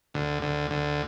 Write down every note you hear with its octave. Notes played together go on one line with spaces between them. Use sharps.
D2
D2
D2